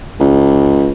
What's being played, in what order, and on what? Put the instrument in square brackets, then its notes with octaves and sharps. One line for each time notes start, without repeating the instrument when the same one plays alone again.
[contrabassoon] C#2